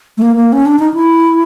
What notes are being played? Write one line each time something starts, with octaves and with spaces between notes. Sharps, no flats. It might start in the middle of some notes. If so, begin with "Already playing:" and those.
A3
A#3
A#3
C#4
D4
D#4
E4